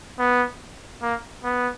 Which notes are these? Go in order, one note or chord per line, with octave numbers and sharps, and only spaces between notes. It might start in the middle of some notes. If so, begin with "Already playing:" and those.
B3
A#3
B3